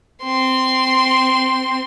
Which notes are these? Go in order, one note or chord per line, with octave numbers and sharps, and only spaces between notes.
C4 C6